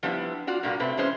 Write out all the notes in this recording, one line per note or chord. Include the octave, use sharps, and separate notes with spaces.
F3 G3 B3 D4 E4
F4 F#4 D5
G2 A#2 A#3 F#4
C3 A3 C4 B4
E3 G#3 C#4 C5